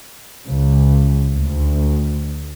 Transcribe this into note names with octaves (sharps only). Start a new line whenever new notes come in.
C#2
D2